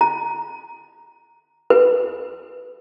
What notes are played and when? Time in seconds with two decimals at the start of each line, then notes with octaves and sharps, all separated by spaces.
0.01 A#5
1.70 B4